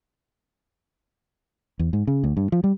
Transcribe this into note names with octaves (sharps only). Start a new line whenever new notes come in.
E2
G#2
C#3
D2
G2
F3
G3